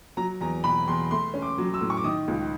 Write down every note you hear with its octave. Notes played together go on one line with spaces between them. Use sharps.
F#3 A#5
E2 A#5
B2 B5
E2 C6
A3 C6
C#4
D6
F#3
E6
A2
C#6
D6
D#3 D#6
C#2